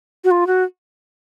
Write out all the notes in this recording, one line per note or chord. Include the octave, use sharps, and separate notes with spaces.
F#4
F4
F#4